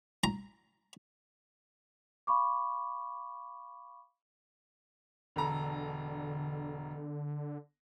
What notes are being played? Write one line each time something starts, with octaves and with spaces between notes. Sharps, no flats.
A#5
F5 B5 C#6 D6
E1 D3 A4 A#5